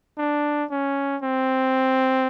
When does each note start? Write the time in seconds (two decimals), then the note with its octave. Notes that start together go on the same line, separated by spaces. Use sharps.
0.18 D4
0.70 C#4
1.22 C4